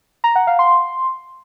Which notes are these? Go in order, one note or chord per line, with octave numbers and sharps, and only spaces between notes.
A#5
F#5
F5
C6